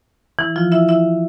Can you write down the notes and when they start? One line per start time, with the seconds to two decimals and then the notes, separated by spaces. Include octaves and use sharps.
0.39 E3 E4
0.56 F3 F4
0.72 E4 E5
0.89 E4 E5